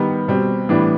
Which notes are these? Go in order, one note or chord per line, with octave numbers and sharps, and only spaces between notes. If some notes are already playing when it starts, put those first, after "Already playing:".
Already playing: D#3 G3 B3
B2 G3 C4
A2 E3 G3 B3 D4